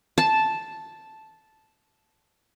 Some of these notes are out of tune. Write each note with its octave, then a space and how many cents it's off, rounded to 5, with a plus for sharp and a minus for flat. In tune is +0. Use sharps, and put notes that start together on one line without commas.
A5 -5